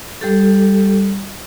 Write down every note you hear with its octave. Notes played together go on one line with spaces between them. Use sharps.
G3 G4 A4